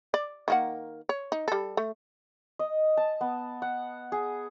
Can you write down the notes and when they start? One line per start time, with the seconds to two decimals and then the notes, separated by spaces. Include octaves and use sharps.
0.14 D5
0.48 D#3 A#3 F#5
1.09 C#5
1.32 D#4
1.48 G3 A4
1.77 A3
2.59 D#5
2.97 A5
3.21 B3
3.62 F#5
4.12 G#4